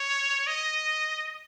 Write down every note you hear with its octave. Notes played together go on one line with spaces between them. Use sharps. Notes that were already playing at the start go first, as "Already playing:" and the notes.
Already playing: C#5
D#5